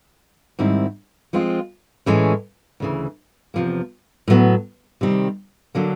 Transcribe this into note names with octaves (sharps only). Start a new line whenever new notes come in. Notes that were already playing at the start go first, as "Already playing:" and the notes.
G#2 D#3 G3 C4 E4
F3 G#3 C4 F4
A2 E3 G#3 C#4
D2 C#3 E3
E2 C3 F3 A#3
A2 F#3 B3
C3 D#3 G3 C4
D3 F#3 A#3 D4